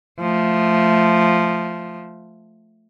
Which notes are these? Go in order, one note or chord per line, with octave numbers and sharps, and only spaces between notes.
F3 A3